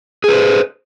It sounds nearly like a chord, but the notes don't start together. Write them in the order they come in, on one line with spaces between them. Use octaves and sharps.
G#4 B4 C5